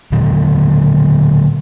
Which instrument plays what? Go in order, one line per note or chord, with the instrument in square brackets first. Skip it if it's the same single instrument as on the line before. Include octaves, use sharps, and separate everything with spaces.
[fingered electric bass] A#2 D3 F#3